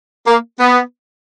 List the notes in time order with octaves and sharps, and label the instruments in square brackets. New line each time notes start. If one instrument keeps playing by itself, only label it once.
[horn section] A#3
B3